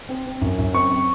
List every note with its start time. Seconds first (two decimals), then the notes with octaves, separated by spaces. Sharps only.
0.09 C4
0.26 C4
0.41 F#2
0.58 F#2
0.74 C4 C#6
0.91 C4